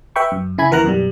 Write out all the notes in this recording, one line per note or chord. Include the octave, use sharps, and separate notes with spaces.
B4 E5 G5 B5 C#6
F#2
C#3 E4 G#5 B5 G#6
D#2 E3 A#4 F#5 A#5 F#6
F#2 B2 G3